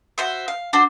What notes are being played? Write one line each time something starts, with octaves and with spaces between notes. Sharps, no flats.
F#4 C5 E5
F5
D4 F#4 C5